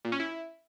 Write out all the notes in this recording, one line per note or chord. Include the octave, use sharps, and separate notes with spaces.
A#2
C#4
E4